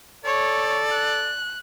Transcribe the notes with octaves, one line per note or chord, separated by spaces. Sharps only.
A4 C#5 D5
F#6